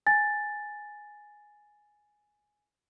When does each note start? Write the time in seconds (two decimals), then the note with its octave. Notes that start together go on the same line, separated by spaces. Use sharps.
0.06 G#5 A6